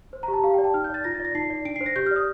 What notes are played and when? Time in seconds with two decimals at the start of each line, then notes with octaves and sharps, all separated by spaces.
0.13 C5
0.23 A#5
0.28 G4
0.33 A5
0.43 G4 F5
0.54 G5
0.58 D5
0.64 A5
0.74 D#4 F6
0.84 G6
0.89 D5 A6
1.04 F4 A#6
1.15 A6
1.20 D5
1.25 A#6
1.35 D#4 C7
1.50 D5
1.65 D4 D7
1.76 C7
1.81 C5
1.86 A#6
1.96 G4 G6
2.06 F6
2.11 D5 D#6